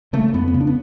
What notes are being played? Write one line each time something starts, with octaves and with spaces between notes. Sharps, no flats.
C#3 A3
A3
F2 B3
B3
C#3
D4
B3